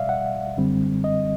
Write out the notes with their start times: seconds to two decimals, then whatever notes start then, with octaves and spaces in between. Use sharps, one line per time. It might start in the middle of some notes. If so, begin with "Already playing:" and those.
Already playing: B2 G3 D5 E5 F5
0.09 F#5
0.57 F#2 D3 G3 C4
1.04 D#5